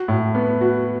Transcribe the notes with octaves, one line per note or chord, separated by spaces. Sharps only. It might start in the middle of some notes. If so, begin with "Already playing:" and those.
Already playing: F#4
A2
B3
F#4